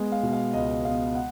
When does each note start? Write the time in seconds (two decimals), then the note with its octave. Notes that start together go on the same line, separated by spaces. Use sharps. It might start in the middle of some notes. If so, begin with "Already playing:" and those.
Already playing: G#3 B3
0.12 F5
0.23 B2
0.33 F5
0.54 C#2 D#5
0.85 B3 F5
1.15 F#5